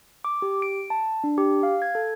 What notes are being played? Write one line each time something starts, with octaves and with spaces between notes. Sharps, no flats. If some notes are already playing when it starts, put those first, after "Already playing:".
D6
G4
D7
A5
D4
G4
F5
G#6
A4